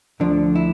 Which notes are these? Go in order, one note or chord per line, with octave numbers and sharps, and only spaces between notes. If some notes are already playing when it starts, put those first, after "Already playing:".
D2 D3 F3 D4
E4